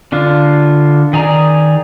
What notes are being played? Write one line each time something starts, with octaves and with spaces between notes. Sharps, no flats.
D3 D4 F4
D#3 G#4 D5 A#5